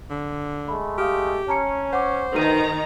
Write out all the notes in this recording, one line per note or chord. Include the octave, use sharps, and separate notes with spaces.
D3
G#3 A3 B5
G4 F5 D#6 F6
C#4 A5 A#5 C#7
C5 F#5 C#6 D6
D2 D#3 D#4 B4 A#5 D#7